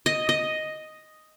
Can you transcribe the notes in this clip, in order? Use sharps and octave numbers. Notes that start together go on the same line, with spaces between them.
D#5
D#5